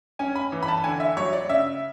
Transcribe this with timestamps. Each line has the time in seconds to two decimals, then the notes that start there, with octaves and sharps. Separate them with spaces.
0.19 C#4 G#5
0.35 B5
0.52 E3
0.63 B5
0.68 A5
0.84 D3 G#5
1.00 E5
1.17 F#3 C#5
1.33 D5
1.49 C#3 E5